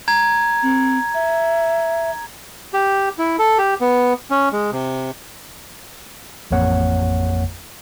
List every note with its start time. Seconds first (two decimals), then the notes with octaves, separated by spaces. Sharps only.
0.08 A#5 G#6
0.63 C4
1.14 E5
2.74 G4
3.19 E4
3.39 A4
3.58 G4
3.81 B3
4.31 C#4
4.53 G#3
4.72 C3
6.51 A1 F2 A#3 C#5 F#5